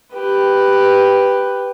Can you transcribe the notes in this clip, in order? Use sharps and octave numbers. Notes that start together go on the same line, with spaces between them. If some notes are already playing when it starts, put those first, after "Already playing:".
G4 B4